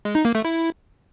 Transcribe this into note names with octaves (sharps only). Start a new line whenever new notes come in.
G#3
D#4
A#3
A3
E4